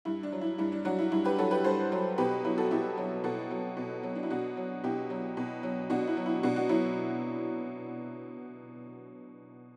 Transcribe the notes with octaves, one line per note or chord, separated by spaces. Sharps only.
G2 E4
D4
F#3
E4
G2 E4
D4
F#3 D4 F#4
E4
G2 E4
G4 B4
F#3 F#4 A4
G4 B4
G2 A4 C5
F#3
B2 G4 B4
F#3 E4
F#4 A4
B2 E4 G4
F#3
B2 F#4 A4
F#3
B2
F#3
D4
E4
B2 D4 F#4
F#3
B2 E4 G4
F#3
B2
F#3
B2 D4 F#4
E4
F#3
E4
B2 D4 F#4
D4 F#4
F#3 E4